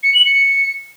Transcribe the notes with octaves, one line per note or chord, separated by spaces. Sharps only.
C#7
F#7
C#7